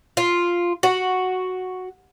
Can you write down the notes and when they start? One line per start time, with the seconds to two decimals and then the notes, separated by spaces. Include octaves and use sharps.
0.17 F4
0.83 F#4